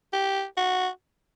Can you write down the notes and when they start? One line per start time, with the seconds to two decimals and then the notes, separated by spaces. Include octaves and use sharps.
0.13 G4
0.57 F#4